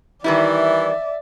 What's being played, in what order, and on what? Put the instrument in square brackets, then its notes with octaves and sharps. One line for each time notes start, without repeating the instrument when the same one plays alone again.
[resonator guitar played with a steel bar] D#3 G3 E4 [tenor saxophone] E3 [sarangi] D5 [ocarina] E5